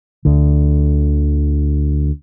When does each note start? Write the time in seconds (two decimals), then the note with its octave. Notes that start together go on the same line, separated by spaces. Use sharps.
0.25 D2 D3